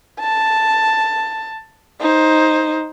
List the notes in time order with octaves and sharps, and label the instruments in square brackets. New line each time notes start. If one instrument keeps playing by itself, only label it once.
[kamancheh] A5
D#4 C5